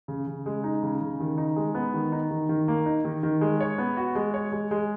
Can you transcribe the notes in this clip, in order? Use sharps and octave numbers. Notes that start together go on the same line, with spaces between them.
C#3
C#3
G#3
D#4
C#3
C#3
D#3
D#4
G#3
B3
D#3
D#4
D#3
D#3
A#3
D#4
D#3
D#3
G#3
C#5
B3
F#4
G#3
C#5
G#3
G#3